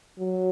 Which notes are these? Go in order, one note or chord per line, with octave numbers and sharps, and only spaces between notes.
F#3